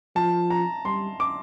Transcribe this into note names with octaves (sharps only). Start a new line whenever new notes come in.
F3 A5
A#5
G3 C6
D6